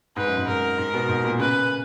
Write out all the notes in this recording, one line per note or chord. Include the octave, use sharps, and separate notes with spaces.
G#2 B4
F#2
G#2
G#2 A#4
G#2
B2
G#2
A#2
C#3 B4